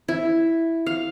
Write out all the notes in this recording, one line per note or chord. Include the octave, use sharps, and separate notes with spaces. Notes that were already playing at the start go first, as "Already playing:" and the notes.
E4
F5